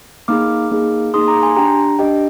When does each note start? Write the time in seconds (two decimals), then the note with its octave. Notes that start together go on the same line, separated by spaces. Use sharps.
0.28 A#3 D#4 G#4 D6 F6
0.71 A#3 D#4 G#4
1.14 A#3 D#4 G#4 C6 D#6
1.28 A#5 D6
1.43 G#5 C6
1.56 D4 G4 G5 A#5
1.99 D4 G4 D#5 G5